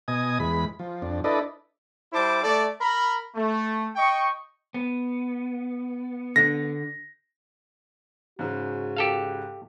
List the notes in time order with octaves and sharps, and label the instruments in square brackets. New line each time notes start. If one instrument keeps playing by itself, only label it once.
[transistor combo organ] B2 D#5 G#5 D#6
E2 G#3 B5
F3
F2 D4
D4 E4 A4 B4 D5 D#5
[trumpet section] G3 E4 C5 A5 D6
A3 A4 D5
A#4 A#5 B5
A3
D#5 G5 C#6
[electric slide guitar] B3
[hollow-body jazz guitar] D3 D4 [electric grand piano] A#6
[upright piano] G#2 C#3 [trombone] F#4
[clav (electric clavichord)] G4 A4 F5